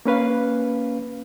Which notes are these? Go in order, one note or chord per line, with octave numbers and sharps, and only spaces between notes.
A#3 C#4 B4 F5